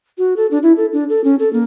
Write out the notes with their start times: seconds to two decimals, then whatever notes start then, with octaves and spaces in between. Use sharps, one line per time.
0.18 F#4
0.36 A4
0.51 D4
0.63 E4
0.77 A4
0.93 D4
1.09 A4
1.24 C#4
1.39 A4
1.53 A#3